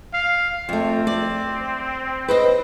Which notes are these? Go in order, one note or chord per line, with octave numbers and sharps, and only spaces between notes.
F5
F2 A3 C4
D5
B4 C5 D#5